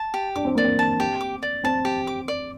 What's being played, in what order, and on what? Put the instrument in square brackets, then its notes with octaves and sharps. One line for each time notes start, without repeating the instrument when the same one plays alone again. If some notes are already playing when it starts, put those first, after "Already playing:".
Already playing: [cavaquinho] A5
G4
[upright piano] D4 [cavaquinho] D6
[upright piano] C4
[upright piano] A#3 [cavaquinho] D5
[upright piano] C4
[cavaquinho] A5
G4
D6
D5
[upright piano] C4 [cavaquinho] A5
[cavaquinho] G4
D6
D5